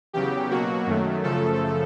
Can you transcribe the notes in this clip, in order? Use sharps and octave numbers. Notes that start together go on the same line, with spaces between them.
E2 C#3 F#3 G4
B2 F#3 A#3 F#4
F#2 D#3 F#3 A3
F#2 C#3 F3 A3 A4